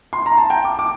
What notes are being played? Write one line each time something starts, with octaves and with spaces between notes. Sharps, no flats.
C6
A#5
A5
G5
D6
D6